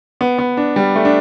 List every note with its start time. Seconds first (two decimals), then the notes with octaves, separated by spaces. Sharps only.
0.21 B3
0.38 B3
0.57 D4
0.76 G3
0.96 A3
1.05 D4